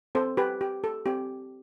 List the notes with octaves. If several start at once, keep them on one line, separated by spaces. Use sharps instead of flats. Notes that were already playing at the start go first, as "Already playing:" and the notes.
C4 A4 C5
G4 B4
G4
A4
C4 G4